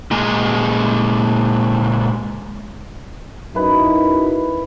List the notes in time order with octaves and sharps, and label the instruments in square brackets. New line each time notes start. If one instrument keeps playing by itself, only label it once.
[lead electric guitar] A#2 G#3
[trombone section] F#2 D#4 [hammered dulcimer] E4 B4